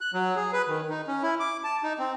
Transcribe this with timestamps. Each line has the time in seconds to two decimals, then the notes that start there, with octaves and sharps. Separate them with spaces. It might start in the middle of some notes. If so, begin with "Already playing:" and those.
0.01 F#6
0.14 F#3
0.36 G#4
0.53 B4
0.68 D#3
0.90 D#4
1.08 C#4
1.23 E4
1.40 D6
1.64 A5
1.83 D#4
1.99 C4